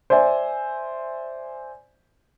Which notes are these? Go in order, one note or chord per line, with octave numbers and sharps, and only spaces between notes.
C5 D5 E5 G#5